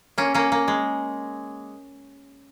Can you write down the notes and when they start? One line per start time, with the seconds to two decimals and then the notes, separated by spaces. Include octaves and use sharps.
0.18 A#3 C#4
0.34 A#3 C#4
0.52 A#3
0.68 G#3